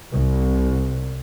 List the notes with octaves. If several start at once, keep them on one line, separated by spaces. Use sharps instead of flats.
C2